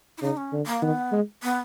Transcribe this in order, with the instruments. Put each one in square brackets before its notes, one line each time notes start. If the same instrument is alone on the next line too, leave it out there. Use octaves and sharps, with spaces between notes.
[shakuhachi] E4
[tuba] C#3 [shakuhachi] D#4
[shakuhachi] C#4
[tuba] D3
[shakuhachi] A#3
[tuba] D#3 [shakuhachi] B3
[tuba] G#3
[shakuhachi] B3